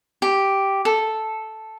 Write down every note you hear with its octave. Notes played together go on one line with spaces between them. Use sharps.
G4
A4